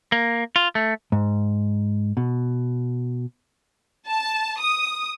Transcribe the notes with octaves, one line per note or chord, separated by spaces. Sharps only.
A#3
F4
A3
G#2
B2
A5
D#6